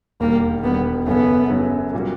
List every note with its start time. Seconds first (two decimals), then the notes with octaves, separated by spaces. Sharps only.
0.20 E1 D#2 D#3 G3 A#3
0.64 E1 D#2 D#3 G3 B3
1.06 F#2 C#3 F#3 A3 B3 C#4
1.50 F#2 C#3 F#3 A3 C#4
1.93 A#2 G3 A#3 C#4 F#4